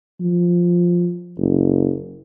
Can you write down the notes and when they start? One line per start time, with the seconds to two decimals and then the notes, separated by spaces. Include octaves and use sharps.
0.21 F3
1.38 F#1